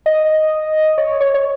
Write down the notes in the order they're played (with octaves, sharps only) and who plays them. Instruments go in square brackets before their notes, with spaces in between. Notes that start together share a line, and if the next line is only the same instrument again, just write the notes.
[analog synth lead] D#5
C#5
C#5
C#5